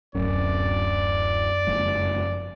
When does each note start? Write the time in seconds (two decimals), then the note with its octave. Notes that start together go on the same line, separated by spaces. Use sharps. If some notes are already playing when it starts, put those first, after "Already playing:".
0.15 D1 F#2 D5
1.67 F#1 F2 G#2